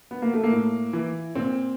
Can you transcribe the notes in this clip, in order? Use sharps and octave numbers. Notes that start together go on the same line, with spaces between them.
B3
A#3
A3
A#3
A2
E3
A#2 C4